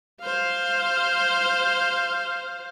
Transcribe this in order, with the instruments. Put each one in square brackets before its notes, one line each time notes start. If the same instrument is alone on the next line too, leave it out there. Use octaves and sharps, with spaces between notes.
[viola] C5 F5